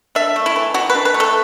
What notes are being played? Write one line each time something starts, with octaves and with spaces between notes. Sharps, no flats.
D4 E5
A3
E4
E3
E3 F#4
B4
D4
B4
A3
A4